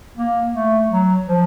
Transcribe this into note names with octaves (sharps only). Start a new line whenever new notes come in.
A#3
A3
F#3
F3